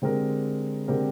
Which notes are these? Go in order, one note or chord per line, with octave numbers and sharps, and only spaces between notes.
D3 G#3 C4 G4 A#4
D3 G#3 C4 G4 A#4